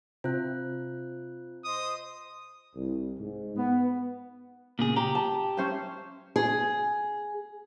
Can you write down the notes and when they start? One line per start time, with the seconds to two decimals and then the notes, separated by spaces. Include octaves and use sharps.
0.24 C3 F4 F#6
1.65 C5 D#5 D#6
2.74 C2
3.20 G#2
3.56 B3
4.79 A#2 C#3 G#4
4.96 G4 A#5
5.15 A5
5.57 C#4 C5 E5
6.36 G#4